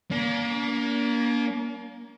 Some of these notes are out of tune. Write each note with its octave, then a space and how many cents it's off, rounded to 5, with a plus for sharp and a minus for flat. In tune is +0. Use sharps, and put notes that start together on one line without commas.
A#3 +20 D4 -40